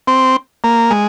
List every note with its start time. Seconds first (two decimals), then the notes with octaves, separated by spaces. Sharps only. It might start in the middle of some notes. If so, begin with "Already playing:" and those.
0.07 C4
0.64 A#3
0.90 G#3